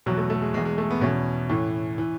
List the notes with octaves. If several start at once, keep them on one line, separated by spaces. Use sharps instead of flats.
E2 B2 F#3
A3
A3
G#3
E2 B2 G#3
G#3
A3
B3
E2 B2 C#4
A2 E3
E3